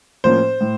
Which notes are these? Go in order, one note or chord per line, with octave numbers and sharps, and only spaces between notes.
A2 F3 A#3 C#4 C5
A2